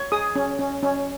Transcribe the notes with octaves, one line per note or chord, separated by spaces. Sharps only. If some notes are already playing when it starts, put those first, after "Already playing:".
Already playing: C#5
G#4 D#6
C#4
C#4
C#4